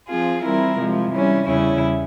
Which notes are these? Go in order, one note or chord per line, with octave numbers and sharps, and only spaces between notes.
F3 C4 F4 G#4
E3 G3 C4 E4 A#4
C3 F3 G#3
E3 G3 C#4
E2 C#3 G3 C#4 E4